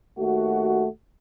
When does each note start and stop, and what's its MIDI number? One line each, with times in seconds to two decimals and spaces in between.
0.19 0.87 39
0.19 0.87 57
0.19 0.87 66